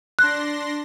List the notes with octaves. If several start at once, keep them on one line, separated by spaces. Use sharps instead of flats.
D4 C6 F#6 A#6